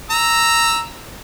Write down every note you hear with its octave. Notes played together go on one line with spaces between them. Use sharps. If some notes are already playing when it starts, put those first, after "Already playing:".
A#5 E6